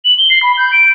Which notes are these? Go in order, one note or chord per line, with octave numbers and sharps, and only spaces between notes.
F#7
G7
C7
B5
G6
D7